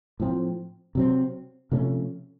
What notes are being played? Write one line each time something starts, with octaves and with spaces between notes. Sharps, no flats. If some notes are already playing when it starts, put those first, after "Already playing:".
A2 F3 C4
C3 F#3 C4
C3 F3 A3 C#4